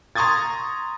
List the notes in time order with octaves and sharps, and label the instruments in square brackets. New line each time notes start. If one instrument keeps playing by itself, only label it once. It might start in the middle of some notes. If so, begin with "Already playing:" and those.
[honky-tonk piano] A#5 C6 C#6 D#6 G#6 A6